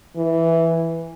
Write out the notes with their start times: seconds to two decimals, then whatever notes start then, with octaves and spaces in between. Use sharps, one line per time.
0.16 E3